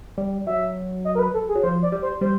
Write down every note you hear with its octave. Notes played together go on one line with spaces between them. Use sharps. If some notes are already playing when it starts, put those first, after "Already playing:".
G3
F#3 E5
D#5
A#4
B4
A4
G#4
F#3
F3 C5
D5
G3
C5
G3 C5